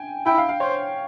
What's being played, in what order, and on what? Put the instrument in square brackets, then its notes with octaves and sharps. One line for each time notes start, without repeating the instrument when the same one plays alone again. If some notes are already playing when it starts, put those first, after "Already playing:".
Already playing: [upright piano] G5 G#5
[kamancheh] E4 [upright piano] G5
[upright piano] F5
F5
[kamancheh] C5 [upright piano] C#5